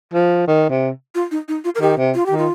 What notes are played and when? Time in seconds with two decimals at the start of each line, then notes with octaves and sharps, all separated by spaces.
0.14 F3
0.47 D#3
0.70 C3
1.15 F4
1.31 D#4
1.48 D#4
1.64 F4
1.75 A#4
1.81 D#3 G4
1.97 C3
2.15 F4
2.26 G4
2.31 D#3
2.38 F4